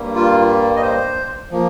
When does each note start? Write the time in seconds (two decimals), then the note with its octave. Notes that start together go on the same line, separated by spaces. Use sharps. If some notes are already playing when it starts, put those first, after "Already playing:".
Already playing: G2 G3 A#3
0.15 F4
0.76 D#5
0.82 C5
1.51 F3 A#3